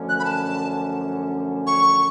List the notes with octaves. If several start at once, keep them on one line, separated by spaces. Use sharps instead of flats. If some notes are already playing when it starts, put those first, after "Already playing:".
Already playing: F#2 D3 F3 A3 C#4
F#6
B5
A5
C#6